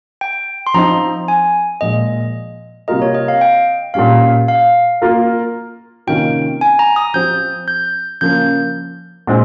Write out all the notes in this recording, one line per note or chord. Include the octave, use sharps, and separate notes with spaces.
G5
C6
F3 C4 D#4 A#5
G#5
A#2 F3 G#3 D#5
C3 G3 A#3 F4 A#4 D#5
C#5
D#5
F5
G5
A#2 G3 C#4 F5
F5
A#3 F4 A#4
C3 D#3 A#3 C#4 F4 G5
G#5
A#5
D#6
F3 C4 G4 C5 G6
G6
C#3 F3 A#3 C#4 G6
A#2 G#3 C4